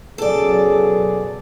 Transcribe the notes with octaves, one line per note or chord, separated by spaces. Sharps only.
B1 F#2 C#3 F#3 B3 G#4 A4 D5